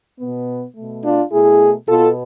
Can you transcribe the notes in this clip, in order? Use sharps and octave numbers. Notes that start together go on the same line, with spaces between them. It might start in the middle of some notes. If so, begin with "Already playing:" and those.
B2 B3
B2 A3
D4 F4
B2 A3 E4 G#4
B2 B3 F4 A4